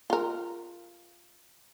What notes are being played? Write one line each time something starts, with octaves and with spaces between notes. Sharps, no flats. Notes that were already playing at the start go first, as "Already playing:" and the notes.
F4 A#4